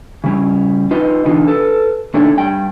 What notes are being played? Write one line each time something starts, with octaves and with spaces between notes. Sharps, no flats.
C#3 G3 C#4
D#4 F4 B4 D#5
B2 D3 E3 D#4 F4
A4 B4
A#2 D3 A3 D4 D#4 C#5
G2 G5